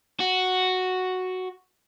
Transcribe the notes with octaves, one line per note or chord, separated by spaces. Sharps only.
F#4